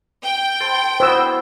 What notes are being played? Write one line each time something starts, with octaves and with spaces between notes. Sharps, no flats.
G5
C5 A5
B3 E4 F#4 C5 E6